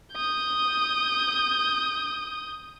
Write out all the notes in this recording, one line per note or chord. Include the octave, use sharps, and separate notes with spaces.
D#6 G6